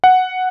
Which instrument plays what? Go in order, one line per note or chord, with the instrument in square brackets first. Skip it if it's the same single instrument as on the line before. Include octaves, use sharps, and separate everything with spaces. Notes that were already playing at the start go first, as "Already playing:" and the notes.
[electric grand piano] F#5